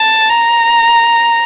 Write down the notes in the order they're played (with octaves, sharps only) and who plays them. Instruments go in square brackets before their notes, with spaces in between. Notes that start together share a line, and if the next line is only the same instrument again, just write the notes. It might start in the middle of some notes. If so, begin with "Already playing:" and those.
Already playing: [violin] A5
A#5